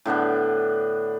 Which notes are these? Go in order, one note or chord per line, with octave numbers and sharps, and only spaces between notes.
A2 D3 B3 D4